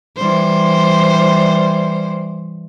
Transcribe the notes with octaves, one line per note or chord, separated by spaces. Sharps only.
E3 G3 C5